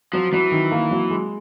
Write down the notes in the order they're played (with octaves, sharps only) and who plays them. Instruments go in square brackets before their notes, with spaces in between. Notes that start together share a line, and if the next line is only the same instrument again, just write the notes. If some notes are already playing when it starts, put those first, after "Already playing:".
[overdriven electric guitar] F3 [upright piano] F#3
[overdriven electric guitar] E3 [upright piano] F#3
[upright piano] D#3
A#3
F#3
G#3